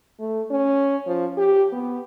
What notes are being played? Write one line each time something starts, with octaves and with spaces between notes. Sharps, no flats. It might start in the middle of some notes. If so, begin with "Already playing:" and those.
A3
C#4
F3
G4
B3